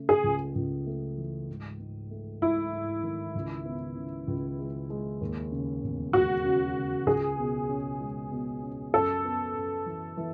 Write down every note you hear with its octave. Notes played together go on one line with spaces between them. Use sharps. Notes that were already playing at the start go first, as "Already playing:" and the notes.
Already playing: C#3 A3
G#4
C#2
C#2
A3
E3
G#2
G#2
A3
G#2 E4
G#2
D#3
C#2
B3
C#3
C#2
G#3
G#3
D#2
C#3
E1
G#3 F#4
C#3
C#3
C#2 G#4
B2
C#4
G#3
B2
C#4
F#2 A4
B3
F#2
E3
E3